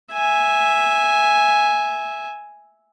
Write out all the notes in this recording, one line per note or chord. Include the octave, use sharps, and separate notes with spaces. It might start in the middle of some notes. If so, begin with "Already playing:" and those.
E5 G#5